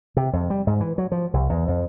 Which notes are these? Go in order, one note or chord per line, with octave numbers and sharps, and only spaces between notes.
C3
F2
G3
G#2
E3
F#3
F3
C2
E2
F2